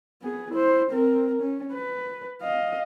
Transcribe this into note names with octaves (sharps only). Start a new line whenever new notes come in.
B3 G#4
E4 C5
C4 A#4
C#4
B4
D#5 F5